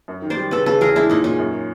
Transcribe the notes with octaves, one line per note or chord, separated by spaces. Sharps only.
F#2
D#3
C5 D5
G3
C#3 A4 B4
C#3 A4 B4
E2 G#4 A#4
G#3 D4 E4
A#2 C#4 D#4
A#2 C#4
F#2